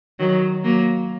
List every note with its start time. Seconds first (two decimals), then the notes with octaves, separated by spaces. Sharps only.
0.20 D#3 F#3
0.64 F#3 A#3